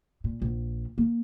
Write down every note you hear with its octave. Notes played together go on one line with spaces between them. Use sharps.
A#2
A#1
A#3